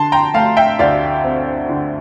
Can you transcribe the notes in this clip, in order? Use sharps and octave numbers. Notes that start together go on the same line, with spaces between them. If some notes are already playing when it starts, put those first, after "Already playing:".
Already playing: D3 A5 C6
G5 A#5
A3 F5 A5
E5 G5
D2 D5 F5
C4
D3